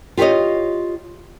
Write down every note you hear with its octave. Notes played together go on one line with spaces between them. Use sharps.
F4 G4 A#4 C#5 D#5